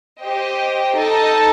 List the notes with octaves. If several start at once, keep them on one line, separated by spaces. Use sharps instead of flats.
G4 C5 D#5 G5
D#4 A4 D#5 A5